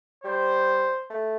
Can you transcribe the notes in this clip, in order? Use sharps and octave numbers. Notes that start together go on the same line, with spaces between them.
G3 C5
A3